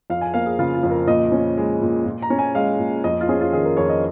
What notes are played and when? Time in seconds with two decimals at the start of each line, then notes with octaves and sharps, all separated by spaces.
0.10 F2 F5
0.21 G#5
0.34 A#3 F5
0.46 G#4
0.59 C#3 F4
0.75 F4
0.83 F2
0.91 A#4
1.07 A#2 D#5
1.32 C#4
1.57 G#3
1.82 A#2
2.05 A#2
2.22 A#5
2.30 C#4
2.39 G#5
2.55 G#3 F5
2.79 A#2
3.04 F2 D#5
3.21 F4
3.29 C#4 G#4
3.41 F4
3.53 D#3 G#4
3.65 A#4
3.77 F2 C#5
3.90 D#5